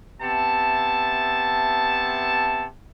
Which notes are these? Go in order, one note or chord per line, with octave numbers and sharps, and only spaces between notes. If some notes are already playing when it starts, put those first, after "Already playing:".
C3 B3 E5 A5